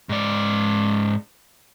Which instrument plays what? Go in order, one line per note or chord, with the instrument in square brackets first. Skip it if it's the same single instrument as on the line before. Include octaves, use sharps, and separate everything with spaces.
[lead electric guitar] G#2 D5